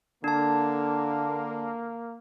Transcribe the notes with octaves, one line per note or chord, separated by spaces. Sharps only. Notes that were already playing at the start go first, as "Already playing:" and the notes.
D3 A#3 D4 A5